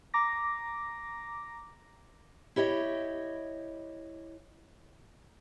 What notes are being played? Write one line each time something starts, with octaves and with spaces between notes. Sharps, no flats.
A#5 D6 A#6
E4 G4 C#5 D#5